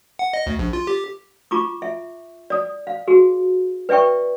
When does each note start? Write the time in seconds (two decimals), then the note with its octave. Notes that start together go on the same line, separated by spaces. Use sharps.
0.19 F#5
0.33 D#5
0.47 D2
0.59 A#1
0.73 F4
0.87 G4
1.51 F4 A#5 C#6 D6
1.82 E5
2.50 D5 D#6
2.87 F5
3.07 F#4 G#4
3.89 B4 D5 E5 G5 C#6